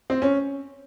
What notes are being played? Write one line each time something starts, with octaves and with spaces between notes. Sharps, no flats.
C4
C#4